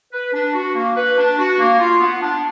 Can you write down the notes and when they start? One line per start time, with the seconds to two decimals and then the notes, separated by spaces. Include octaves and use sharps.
0.13 B4
0.33 D4
0.53 F#4
0.75 A#3
0.96 B4
1.17 D4
1.38 F#4
1.59 A#3
1.80 F4
2.00 B3
2.22 D4